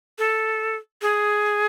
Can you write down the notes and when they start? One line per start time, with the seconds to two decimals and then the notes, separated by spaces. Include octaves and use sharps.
0.18 A4
1.02 G#4